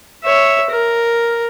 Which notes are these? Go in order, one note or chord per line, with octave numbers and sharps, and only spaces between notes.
C#5 E5
A#4